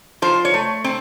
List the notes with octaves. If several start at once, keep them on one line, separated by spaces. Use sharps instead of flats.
F3 C5
C#5
A3
C4